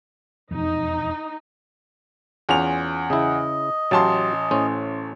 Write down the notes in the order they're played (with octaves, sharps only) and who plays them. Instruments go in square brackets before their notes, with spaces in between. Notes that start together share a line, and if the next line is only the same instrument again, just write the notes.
[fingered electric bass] E1 F2 [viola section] D#4
[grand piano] E2 F7 [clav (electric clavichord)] C#4 F4 G#4
[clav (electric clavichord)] C#3 E4 [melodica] D#5
[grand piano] A1 A5 C6 [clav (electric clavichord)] F#3 G4 F5
[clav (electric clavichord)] A2 C#4 C5